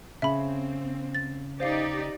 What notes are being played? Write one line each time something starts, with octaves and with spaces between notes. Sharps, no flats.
C#3 C4 E5 B5
A6
D#4 G4 C5 D5 F5 C7